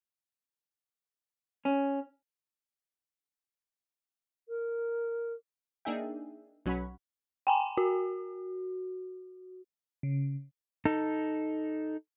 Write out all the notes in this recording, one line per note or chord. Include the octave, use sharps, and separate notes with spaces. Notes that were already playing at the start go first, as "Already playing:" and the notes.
C#4
A#4
A#3 D4 D#4 G#4 E5 G5
B1 F#3 C#4 C#5 F#5 B5
G5 G#5 A#5
F#4
C#3
D#4 A4